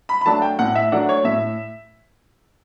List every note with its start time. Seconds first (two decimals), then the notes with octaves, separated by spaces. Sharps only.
0.09 B5
0.21 B5
0.26 F#3 A3 D4 A5
0.42 G5
0.59 A2 F#5
0.75 E5
0.92 F#3 A3 D4 F#5
1.09 C#5
1.24 A2 E5